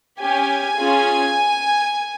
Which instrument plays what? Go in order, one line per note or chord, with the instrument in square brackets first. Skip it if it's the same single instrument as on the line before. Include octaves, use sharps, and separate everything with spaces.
[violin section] C#4 G4 G#5
C#4 F4 G#4